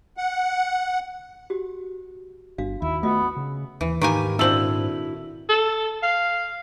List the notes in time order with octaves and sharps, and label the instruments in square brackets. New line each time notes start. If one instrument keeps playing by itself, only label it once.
[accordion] F#5
[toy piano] F#4 G4
[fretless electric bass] G1 [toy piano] D4 F#4 F5
[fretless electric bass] D#2 [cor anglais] E4
[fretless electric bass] A3 [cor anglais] B3 [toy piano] F4 F#4 D#5
[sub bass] C#3
[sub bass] D#2 [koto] E3
[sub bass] G#2 [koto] D#3 A#3 G#5 [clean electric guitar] G4 B4
[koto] A#2 C4 A4 [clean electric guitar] D4 E4 F#4 [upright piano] E6 F#7
[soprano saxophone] A4
F5